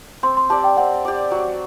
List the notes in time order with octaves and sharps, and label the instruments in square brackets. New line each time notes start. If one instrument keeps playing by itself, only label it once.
[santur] C4 [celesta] C6
[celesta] C6
[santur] G4 D5 [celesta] A5
[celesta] G5
[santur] C4 [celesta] F#5
[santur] G4 D5
F#3